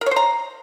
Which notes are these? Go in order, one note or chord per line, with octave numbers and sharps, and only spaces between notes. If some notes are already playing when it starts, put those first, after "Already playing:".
A#4
C#5
C5
A#5